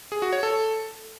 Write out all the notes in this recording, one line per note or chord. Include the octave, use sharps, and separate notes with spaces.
G#4
F#4
C#5
A4